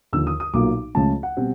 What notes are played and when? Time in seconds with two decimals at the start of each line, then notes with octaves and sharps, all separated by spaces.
0.13 D#2 D3 F3 E6
0.27 D#6
0.40 D#6
0.54 B1 A#2 F#3 A#3 D6
0.95 C#2 C#3 F3 A3 C#4 A5
1.23 F#5
1.37 B2 G3 C4